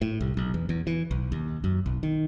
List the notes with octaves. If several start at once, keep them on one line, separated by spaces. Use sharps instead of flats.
A2
C2
B1
E2
E2
E3
B1
D#2
F#2
B1
D#3